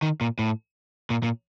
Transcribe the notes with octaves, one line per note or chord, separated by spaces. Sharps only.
D#3
A#2
A2
A#2
A#2